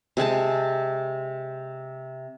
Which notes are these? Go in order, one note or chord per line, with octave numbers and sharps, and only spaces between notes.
C3 G#3 G#5 A5